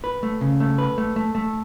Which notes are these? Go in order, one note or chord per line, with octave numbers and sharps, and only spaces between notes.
B4
A3
C#3
A3
B4
A3
A3
A3